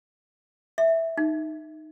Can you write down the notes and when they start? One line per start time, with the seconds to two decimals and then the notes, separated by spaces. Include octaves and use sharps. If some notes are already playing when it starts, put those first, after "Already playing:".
0.78 E5
1.17 D#4